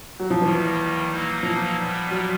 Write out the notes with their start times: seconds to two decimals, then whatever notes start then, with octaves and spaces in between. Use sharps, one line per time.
0.20 F#3
0.30 F3
0.41 D#2 D#3 E3 G3
1.09 B2 F#3 A#3 D#4
1.43 F3
1.77 A#2 G3 B3
2.11 F#3